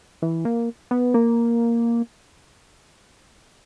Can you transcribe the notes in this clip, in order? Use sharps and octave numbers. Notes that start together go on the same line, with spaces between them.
E3
A#3
B3
A#3